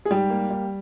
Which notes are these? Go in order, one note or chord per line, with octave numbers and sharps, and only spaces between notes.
G#4
G#2 G3 G4
A#3
G3